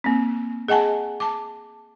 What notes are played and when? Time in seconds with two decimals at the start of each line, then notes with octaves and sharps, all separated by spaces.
0.04 A#3 C4
0.68 G#4 D#5 F#5 G#5 A5
1.20 A5 D6